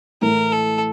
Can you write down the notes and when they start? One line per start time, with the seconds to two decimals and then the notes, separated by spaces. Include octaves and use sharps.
0.22 A2 E3 A3 A#4
0.52 A4